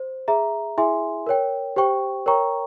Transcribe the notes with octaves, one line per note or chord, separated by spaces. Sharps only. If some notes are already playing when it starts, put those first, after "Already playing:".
Already playing: C5
G#4 E5 A#5
E4 G#4 E5 G#5 C6
A#4 C#5 G5
G4 C5 G5 C#6
A#4 C#5 G5 A#5 C#6